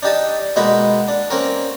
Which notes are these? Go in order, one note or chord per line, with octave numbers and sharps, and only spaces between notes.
D4 D#4 G4 D#5 A5
B2 G#3 A#3 D#4 F#5 B5
D4
A#3 C4 C#4 A#4